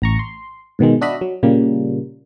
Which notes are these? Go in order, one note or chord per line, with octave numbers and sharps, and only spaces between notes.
A1 A#5 C#6
C6
G#2 B2 D#3 G#3
D4 F#4 D#5 E5 B5
F#3
A#2 C#3 G3 A#3